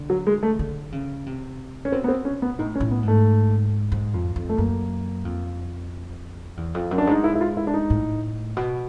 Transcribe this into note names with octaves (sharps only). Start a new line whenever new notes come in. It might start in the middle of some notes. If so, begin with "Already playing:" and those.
Already playing: D3
F#3
G#3
A3
D3
C#3
C3
C#4
B2 C4
B3
C4
C#4
B3
A2 D#4
C#4
A2
B3
G#2
A3
G#2
F2
F2
A3
F#2 A#3
F2
E2
F2
F#2
D4
G#2 D#4
E4
E4
F4
E4
D4
D#4
A2
B2